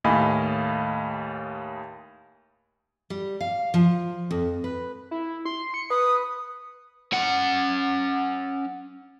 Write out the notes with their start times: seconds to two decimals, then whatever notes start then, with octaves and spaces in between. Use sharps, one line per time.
0.04 D#2 A2 D#5 F5 G#5 B5
3.10 G3
3.41 F5
3.74 F3
4.31 F2
4.64 B4
5.11 E4
5.45 C6
5.74 C#7
5.90 B4 D#6
7.13 C#4 F#5